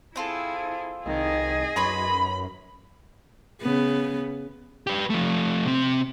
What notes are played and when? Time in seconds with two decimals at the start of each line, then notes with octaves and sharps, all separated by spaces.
0.16 C4 E4 F4 G#4 A4
1.06 C2 D#3 G#4 D#5
1.76 F#2 B4 C#5 B5 C6
3.61 C#3 B3
4.87 G4 B4
5.10 F3 A3
5.66 C3 C4